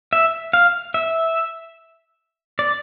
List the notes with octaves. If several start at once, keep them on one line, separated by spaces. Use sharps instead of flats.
E5
F5
E5
D5